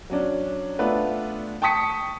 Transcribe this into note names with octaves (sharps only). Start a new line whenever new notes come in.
F#3 C#4 D4
A3 B3 D4 F4 B4
G5 A5 C#6 D#6 B6 C#7